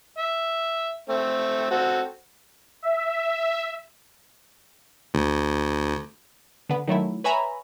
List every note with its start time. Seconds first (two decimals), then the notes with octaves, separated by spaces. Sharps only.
0.19 E5
1.09 A3 C4
1.71 C4 F#4 A4
2.82 E5
5.14 D2
6.69 D3 B3
6.88 D#3 F#3 A3 E4
7.24 B4 C#5 E5 G#5 A#5 B5